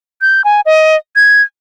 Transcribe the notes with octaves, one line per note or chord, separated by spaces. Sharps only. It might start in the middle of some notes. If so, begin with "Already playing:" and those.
G6
G#5
D#5
G#6